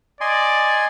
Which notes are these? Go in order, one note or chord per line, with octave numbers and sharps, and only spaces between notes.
D5 D#5 G#5 C6